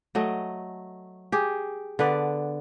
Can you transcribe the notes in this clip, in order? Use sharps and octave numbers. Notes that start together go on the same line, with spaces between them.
F#3 A3 D#5
G4 G#4
D3 B3 B4 D5